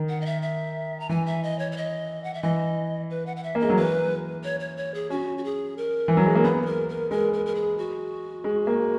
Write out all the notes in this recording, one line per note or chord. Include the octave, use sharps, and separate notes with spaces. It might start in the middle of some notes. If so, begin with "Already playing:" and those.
Already playing: D#3
F#5
D#5
E5
E5
A#5
E3 G#5
E5
D#5
C#5
C#5
D#5
F#5
E5
E3 D#5
B4
F#5
F#5
E5
A#3
G#3 D#5
F#3
E3 B4
C#5
C#5
C#5
G#4
C#4 F#4
F#4
G#4
A#4
E3
F#3
G#3
A#3
B3 G#4
G#4
A#4
A#4
G#3 A#4
A#4
A#4
G#4
F#4
G#3
A#3